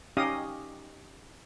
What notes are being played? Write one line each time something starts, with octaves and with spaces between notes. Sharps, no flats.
C#4 D#4 G4 D#5 F5 D#6